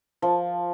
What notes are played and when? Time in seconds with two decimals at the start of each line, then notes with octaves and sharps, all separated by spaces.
0.22 F3